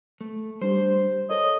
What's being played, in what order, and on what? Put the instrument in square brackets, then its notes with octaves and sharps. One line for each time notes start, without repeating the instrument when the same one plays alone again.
[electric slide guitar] A3
[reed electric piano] G3 D4 G4 [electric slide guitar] C5
[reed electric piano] A4 A#4 C#5 [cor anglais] D#5